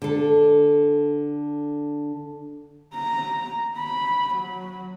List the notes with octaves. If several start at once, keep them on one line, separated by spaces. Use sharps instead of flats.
D3 A4
A#5
B5
F#3